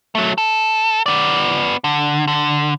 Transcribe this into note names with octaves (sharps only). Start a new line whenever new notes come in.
F#3 A3
A4
B3 D5
D3
D3